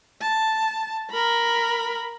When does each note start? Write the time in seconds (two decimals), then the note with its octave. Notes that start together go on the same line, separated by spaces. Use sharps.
0.21 A5
1.11 A#4 B5